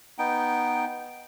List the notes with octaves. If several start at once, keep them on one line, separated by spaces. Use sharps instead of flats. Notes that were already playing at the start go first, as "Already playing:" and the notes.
B3 D#4 G5